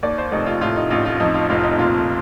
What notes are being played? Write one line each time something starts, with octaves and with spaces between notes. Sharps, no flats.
D#2 D5
C5
F1 D#4
F4
A2 F4
D#4
A1 F4
F4
F2 D#4
F4
F1 F4
D#4
A#2 F4